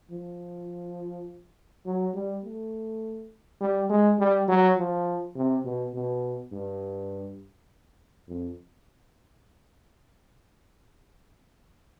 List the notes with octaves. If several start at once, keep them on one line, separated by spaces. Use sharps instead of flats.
F3
F#3
G3
A3
G3
G#3
G3
F#3
F3
C3
B2
B2
G2
F2